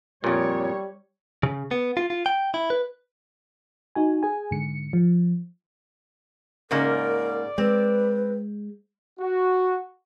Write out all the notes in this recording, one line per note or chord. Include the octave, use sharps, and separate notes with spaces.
F2 A#2 G3 C#5
C#3
B3
F4
F4
G5
E4
B4
D#4 F#4 G#5
G#4 G#5
G#2 D3 C#7
F3
G#2 C#3 A#3 A#4 D5
G#3 C4 B4
F#4